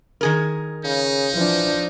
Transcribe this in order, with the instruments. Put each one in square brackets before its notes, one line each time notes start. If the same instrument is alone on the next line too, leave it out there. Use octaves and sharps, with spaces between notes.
[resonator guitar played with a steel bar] D#3 G#4 A#4
[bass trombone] C#3 [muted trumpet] D#4
[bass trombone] E3 [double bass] F3 D4